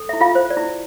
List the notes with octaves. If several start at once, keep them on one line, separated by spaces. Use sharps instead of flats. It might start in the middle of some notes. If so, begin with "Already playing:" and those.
Already playing: A4
E4 E5
F4 F5
C5
D5
E4